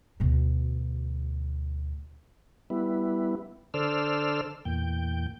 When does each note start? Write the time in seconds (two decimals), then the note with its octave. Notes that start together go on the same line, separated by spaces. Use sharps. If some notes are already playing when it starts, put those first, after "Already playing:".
0.20 D2 B2
2.70 G3 B3 E4
3.74 D3 A4 C5 D5 E6 F6
4.65 E2 A#2 G5